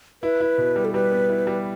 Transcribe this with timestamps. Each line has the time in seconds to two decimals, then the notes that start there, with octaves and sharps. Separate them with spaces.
0.23 E4 B4
0.41 E4
0.58 B2
0.76 G3
0.85 A4
0.93 G3 B4
1.11 B3
1.29 E4
1.47 G3